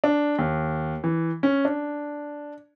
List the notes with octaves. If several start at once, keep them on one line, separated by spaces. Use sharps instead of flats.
D4
D#2
E3
C#4
D4